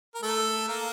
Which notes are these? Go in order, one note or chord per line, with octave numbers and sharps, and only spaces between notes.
A#4
A3 A4
A#3 A#4